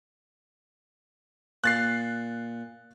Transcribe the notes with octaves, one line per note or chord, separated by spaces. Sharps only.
A#2 F#6 A6 C7